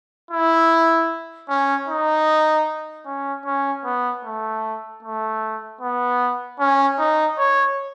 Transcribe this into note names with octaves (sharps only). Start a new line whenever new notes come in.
E4
C#4
D#4
C#4
C#4
B3
A3
A3
B3
C#4
D#4
C#5